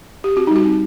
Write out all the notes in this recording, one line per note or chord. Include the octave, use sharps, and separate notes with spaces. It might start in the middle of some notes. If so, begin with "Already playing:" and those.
G4
C4 F#4
D#4
G3 F#4
C4